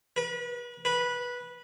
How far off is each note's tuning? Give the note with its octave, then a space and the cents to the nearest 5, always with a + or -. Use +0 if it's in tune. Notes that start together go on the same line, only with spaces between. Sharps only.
B4 -35
B4 -15